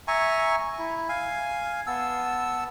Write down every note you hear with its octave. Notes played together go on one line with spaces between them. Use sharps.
E5 G#5 A#5 C#6
E4
F5 G#5
B3 A5 E6